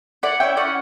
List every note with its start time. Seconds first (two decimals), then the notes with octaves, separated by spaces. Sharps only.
0.23 E4 D5 F#5
0.40 C#4 E5 G5
0.57 C#4 D5 F#5